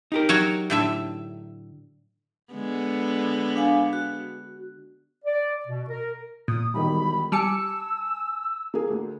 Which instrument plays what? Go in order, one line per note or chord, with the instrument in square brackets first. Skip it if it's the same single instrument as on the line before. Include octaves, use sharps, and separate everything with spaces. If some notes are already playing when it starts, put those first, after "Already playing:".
[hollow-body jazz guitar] D#4 G4 A#4
[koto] F#3 F#4 C#5
A2 D3 E5
[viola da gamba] D3 G#3 B3
[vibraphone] D4 F5 G#5
F#4
[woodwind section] D5
B2
A#4
[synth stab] A#2 [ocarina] D#6
[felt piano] E1 D#3 G3 [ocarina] B5
[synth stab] G3 D6 C#7 [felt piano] G#5 A5 [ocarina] E6
[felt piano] A#3 G#4
D2